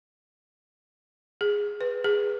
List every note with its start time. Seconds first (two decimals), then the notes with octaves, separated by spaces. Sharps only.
1.41 G#4
1.81 B4
2.04 G#4